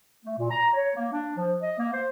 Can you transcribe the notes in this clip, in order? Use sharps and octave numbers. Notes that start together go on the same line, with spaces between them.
A3
A#2
A#5
C#5
A#3
D4
F3
D#5
A#3
C5